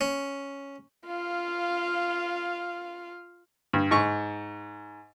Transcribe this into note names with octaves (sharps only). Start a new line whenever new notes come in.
C#4
F4 F5
G2
G#2 C#6